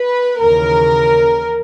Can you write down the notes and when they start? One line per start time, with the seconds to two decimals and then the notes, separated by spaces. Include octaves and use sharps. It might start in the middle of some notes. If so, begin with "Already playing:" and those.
Already playing: B4
0.41 D#2 C#3 E3 A#4